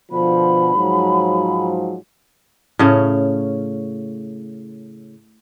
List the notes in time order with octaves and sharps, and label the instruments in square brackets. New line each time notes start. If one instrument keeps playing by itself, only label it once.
[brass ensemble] B2 D3 F3 [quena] B5
[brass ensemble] G#2 F3 F#3
[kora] A2 C#3 C#4